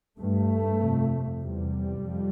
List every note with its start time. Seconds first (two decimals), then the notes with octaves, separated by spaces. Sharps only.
0.18 G2 A3
0.79 F2 C3
1.40 E2 C3 G3
2.01 F2